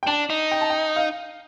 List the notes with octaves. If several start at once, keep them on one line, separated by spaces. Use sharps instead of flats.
G5
D4 A5
D#4
G5
A5
G5
F5